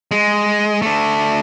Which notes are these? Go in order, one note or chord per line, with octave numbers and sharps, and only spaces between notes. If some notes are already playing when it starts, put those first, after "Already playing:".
G#3
A3 D4